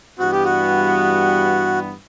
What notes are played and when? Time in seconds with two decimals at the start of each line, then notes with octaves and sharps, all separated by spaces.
0.19 G2 E3 G3 B3 F#4
0.32 G4
0.44 F#4